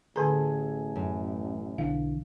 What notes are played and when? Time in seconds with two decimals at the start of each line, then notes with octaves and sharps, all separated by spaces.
0.16 A1 D3 G#4 A4 G#5 A#5
0.96 F#2
1.78 B1 D3 E3 F5